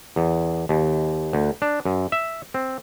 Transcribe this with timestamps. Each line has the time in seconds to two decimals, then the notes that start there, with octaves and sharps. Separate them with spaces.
0.16 E2
0.69 D#2
1.33 D2
1.62 D4
1.85 F#2
2.12 E5
2.54 C4